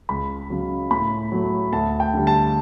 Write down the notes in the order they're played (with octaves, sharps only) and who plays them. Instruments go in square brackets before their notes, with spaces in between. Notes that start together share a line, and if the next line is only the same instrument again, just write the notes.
[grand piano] C#2 B5
C#3 F#3
A2 B5
F#3 A3
D2 A5
G5
D3 G3
A5